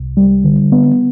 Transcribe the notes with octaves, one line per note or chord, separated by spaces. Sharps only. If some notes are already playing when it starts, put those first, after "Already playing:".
Already playing: C2
G3
D3
B3